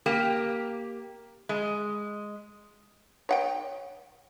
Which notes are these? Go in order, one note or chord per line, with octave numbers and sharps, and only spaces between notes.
A#3 G4
G#3
C#5 F#5 G5